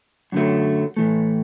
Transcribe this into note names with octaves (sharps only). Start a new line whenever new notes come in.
F#2 D3 F#3 A3
A2 E3 A3